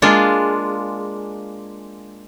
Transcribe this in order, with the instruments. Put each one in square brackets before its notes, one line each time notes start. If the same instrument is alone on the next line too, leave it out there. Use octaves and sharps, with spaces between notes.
[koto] G#3 A#3 D4 F4 G#4